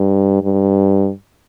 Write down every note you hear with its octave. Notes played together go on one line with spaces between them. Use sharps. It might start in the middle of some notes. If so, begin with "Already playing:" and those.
Already playing: G2
G2